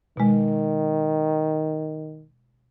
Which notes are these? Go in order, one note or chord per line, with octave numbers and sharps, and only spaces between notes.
B2 D#3 G#3